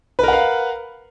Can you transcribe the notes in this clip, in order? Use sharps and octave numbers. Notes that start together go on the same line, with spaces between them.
A#4 B4 F5 F#5